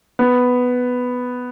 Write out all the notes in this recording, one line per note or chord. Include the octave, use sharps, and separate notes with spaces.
B3